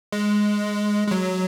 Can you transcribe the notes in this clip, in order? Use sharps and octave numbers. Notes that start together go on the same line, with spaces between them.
G#3
G#3
F#3